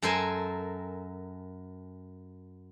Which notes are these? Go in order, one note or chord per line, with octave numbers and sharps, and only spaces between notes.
F#2 A4 A#4 C5 G#5 A5